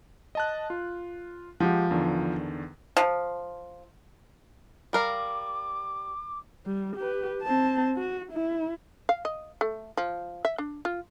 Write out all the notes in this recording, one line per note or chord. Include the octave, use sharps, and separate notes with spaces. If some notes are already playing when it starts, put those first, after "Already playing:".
D#5 A5 F#6
F4
F3 G#3 G4 F#5
E2 D3 D#3
F3
G3 A#4 F5 D6
G3
G4 B4
C4 A5
F#4
E4
F5
D#5
A3
F3
E5
D4
F4